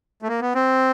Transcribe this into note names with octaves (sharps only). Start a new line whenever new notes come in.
A3
A#3
B3
C4